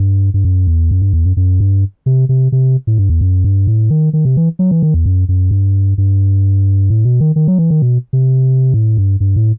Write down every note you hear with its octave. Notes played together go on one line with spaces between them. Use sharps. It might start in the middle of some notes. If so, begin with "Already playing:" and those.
Already playing: G2
G2
F#2
E2
F#2
G2
E2
F#2
F#2
G2
C3
C3
C3
A2
G2
E2
F#2
G2
A2
D#3
D#3
C3
E3
F#3
E3
D#3
E2
F#2
F#2
G2
G2
A2
B2
D#3
D#3
F#3
E3
D#3
B2
C3
A2
G2
G2
A2